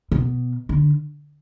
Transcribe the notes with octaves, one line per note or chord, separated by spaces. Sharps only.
B2
D3